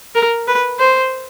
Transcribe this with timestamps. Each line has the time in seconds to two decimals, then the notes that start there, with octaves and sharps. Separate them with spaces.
0.15 A#4
0.48 B4
0.79 C5